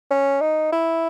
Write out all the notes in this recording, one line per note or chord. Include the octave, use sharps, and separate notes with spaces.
C#4
D#4
E4